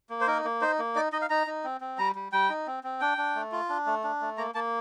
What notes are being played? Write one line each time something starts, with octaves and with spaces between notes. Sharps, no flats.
A#3
C5
D#4 A#4
A#3
D#4 C5
A#3
D#4 D5
D#4 D#5
F5
D#4 A#5
D#4
C4
C4
G3 A#5
G3
G3 G5
D#4
C4
C4
D4 G5
D4
A3
F4
D4
A3
D4
A3
A#3 A#5
A#3 A5